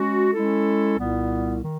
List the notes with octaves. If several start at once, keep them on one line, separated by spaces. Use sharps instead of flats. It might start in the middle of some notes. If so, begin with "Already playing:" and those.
Already playing: G#3 C#4 F#4
G#3 C#4 E4 A4
C2 A#2 G3 B3
D#3